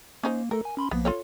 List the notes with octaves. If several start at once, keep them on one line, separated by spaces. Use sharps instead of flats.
A#3 C#4 D#4 C5
A3 A4 A#4
G#5
C#4 B5 C6
B1 F3 A#3 B3
F4 A4 C#5